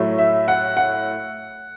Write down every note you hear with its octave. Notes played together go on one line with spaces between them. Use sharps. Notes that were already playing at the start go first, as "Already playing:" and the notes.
Already playing: A2 F#3 A3
E5
F#5
F#5